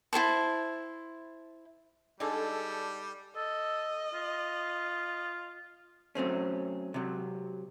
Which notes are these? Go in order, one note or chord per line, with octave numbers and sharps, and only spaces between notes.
E4 G#4 C5 A5
D3 G3 G#3 D4 D#4 G#4 A4
A4 D#5
F4
F#3 A3 C4 C#4
C3 F#3